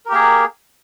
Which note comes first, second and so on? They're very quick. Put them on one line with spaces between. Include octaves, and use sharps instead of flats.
A#4 G4 A#3 G#4